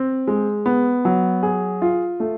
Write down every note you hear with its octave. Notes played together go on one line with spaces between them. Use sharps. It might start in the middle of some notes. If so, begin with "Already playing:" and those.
Already playing: C4
G#3
B3
F#3
G#4
F4
A3